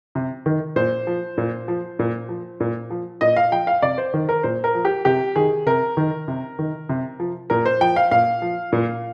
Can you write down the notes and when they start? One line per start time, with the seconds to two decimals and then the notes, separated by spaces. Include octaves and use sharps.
0.15 C3
0.46 D#3
0.76 A#2 C5
1.07 F3
1.38 A#2
1.68 F3
1.99 A#2
2.29 F3
2.60 A#2
2.90 F3
3.21 A#2 D#5
3.36 F5
3.52 F3 G5
3.67 F5
3.82 C3 D5
3.98 C5
4.14 D#3
4.29 A#4
4.43 A#2 C5
4.64 A#4
4.75 F3
4.85 G4
5.05 C3 G4
5.36 D#3 G#4
5.66 C3 A#4
5.97 D#3
6.28 C3
6.59 D#3
6.89 C3
7.20 F3
7.50 A#2 A#4
7.66 C5
7.81 F3 G5
7.96 F5
8.11 A#2 F5
8.42 F3
8.73 A#2